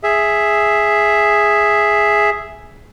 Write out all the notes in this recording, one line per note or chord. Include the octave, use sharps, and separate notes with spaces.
G#4 E5